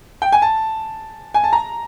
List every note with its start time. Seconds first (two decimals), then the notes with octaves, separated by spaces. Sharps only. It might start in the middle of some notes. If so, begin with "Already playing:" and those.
0.22 G5
0.32 G#5
0.42 A5
1.34 G#5
1.44 A5
1.53 A#5